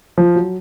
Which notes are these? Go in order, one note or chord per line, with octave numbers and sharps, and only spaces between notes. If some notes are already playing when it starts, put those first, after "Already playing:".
F3
F#3